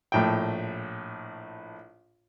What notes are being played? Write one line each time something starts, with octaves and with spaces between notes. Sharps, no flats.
A#1 A2 G5